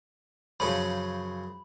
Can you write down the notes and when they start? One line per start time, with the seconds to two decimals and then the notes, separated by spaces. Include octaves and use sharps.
0.60 F#2 C#3 F3 B5